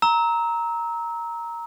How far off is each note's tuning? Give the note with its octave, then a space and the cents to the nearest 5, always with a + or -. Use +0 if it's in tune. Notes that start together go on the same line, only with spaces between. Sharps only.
A#5 +0 E6 -30